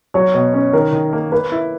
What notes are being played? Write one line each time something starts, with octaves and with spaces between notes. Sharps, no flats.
F#3 C#5
B2
C#4
D#3 A#4
D#3
A#3
A#3 B4
E4